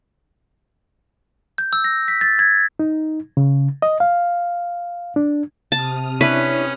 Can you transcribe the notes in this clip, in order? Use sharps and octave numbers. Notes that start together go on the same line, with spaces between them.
G6
E6
A#6
B6
A6
G#6
D#4
C#3
D#5
F5
D4
C3 A5 D#6 F6
C#4 D4 E4 B4 C#5